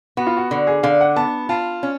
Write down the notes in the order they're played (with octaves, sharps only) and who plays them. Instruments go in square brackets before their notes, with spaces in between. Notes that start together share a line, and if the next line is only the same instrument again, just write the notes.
[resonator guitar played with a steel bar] B3 [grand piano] F#4
[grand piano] F4
F#4
[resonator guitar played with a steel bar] D3 [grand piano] F#4
[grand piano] G#4
[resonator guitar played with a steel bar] D3 [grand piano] F5
[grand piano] F#5
[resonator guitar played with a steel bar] B3 [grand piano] A5
[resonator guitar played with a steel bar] F4 [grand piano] A5
[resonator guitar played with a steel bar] C#4